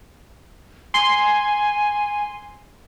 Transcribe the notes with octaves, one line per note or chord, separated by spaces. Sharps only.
G#5 C6